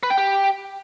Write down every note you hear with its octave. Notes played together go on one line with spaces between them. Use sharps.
B4
G5
G4